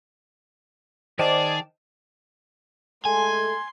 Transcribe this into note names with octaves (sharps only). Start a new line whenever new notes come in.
D#3 G#4 C5 D5 D#5 G5 A5
G#3 A3 A4 G#5 C6